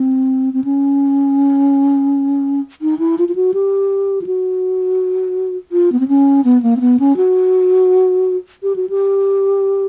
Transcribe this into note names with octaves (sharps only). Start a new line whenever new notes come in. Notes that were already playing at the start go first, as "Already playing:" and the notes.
Already playing: C4
C4
C#4
D#4
E4
F4
F4
F#4
G4
F4
F#4
F4
B3
C4
C#4
B3
A#3
C4
B3
C#4
F#4
G4
F#4
G4